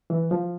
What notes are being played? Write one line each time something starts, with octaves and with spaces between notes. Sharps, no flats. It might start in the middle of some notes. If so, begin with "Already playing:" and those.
E3
F3